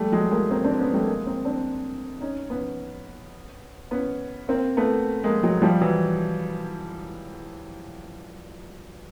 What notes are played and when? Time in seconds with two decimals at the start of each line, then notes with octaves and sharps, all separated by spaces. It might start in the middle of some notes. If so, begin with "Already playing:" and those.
Already playing: G3 A3
0.12 F#3 G#3
0.31 G#3 A#3
0.51 A#3 C4
0.64 C4 D4
0.79 B3 C#4
0.93 G3 A3
1.07 G#3 A#3
1.26 A#3 C4
1.45 C4 D4
2.21 C#4 D#4
2.50 B3 C#4
3.91 B3 C#4
4.48 A#3 C4
4.77 A3 B3
5.24 G#3 A#3
5.43 F#3 G#3
5.62 F3 G3
5.81 E3 F#3